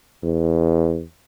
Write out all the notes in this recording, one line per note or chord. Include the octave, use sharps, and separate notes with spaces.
E2